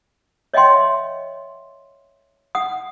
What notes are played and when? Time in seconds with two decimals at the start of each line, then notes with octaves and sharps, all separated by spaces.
0.54 C#5 D#5 E5 F#5 G5 C6
2.55 F#5 D#6